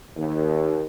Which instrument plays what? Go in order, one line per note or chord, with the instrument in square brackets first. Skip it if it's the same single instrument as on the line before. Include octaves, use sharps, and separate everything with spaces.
[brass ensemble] D#2